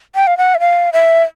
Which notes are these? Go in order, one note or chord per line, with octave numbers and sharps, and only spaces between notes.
G5
F5
F#5
E5
F5
E5